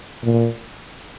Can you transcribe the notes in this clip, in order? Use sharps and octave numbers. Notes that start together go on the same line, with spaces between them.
A#2